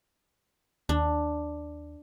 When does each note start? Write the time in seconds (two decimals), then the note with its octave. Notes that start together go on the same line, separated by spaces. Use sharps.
0.89 D#2 D4